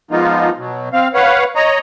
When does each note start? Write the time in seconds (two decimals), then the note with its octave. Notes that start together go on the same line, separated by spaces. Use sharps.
0.11 F3 G#3 A#3 B3 D#4 F4
0.58 B2 F#3
0.93 C4 F5
1.14 B4 C#5 F5 F#5
1.55 C#5 D#5 A#5